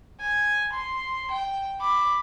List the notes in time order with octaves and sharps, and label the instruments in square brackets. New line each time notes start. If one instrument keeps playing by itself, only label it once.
[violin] G#5
C6
G5
B5 D6